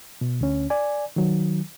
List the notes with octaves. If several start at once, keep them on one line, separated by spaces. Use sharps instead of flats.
B2
D2 C#4
D5 G#5
D#3 F#3